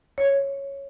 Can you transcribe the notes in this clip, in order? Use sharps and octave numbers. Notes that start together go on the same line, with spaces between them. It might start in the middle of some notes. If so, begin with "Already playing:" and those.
C#5